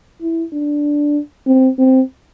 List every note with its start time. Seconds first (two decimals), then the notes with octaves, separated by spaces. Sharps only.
0.22 E4
0.53 D4
1.47 C4
1.79 C4